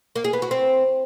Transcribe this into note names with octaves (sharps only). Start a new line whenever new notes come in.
A#3
G#4
B3
F#4
C4